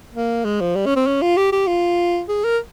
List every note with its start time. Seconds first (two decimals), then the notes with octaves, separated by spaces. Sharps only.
0.15 A#3
0.45 G#3
0.61 F3
0.76 G3
0.86 C#4
0.96 C4
1.07 C#4
1.22 F4
1.37 G4
1.52 G4
1.67 F4
2.29 G#4
2.44 A#4